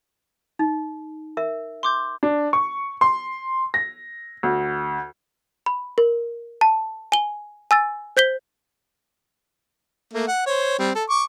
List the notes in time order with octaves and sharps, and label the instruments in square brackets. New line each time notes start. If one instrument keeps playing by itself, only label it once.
[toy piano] D#4
A#4 E5
[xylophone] C6 D6 G6
[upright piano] D4
C#6
C6
A#6
D2
[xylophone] B5
A#4
A5
G#5 G7
G#5 E6 A6
C5 G6 B6 G7
[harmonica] A3 A#3
F#5
C5 C#5
G3 C4
A4
C#6 D6